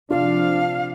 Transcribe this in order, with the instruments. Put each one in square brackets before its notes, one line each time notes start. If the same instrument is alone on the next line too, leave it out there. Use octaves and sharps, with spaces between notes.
[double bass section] C3 F3 [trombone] D4 [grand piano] F4 [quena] F5